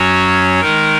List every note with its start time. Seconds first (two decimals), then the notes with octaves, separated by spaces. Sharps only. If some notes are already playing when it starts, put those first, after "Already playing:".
Already playing: F#2 F#3 C#4 F#4 C#5
0.60 D#3 G#3 D#4 A#4